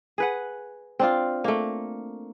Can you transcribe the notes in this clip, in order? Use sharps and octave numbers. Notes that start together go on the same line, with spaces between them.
G#4 B4 F#5
C4 D4 F4
A3 A#3